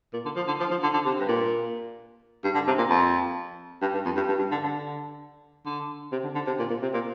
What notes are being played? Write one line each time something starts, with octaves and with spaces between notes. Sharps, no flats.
A#2
D3
F3
D3
F3
F3
D3
D3
C3
G2
A#2
G2
D3
C3
A#2
F2
G2
G2
F2
G2
G2
G2
D3
D3
D3
C3
D3
D3
C3
A#2
A#2
C3
A#2